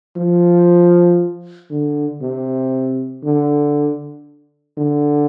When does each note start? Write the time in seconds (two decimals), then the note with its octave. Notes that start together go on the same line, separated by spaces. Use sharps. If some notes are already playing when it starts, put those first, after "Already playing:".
0.16 F3
1.71 D3
2.22 C3
3.24 D3
4.77 D3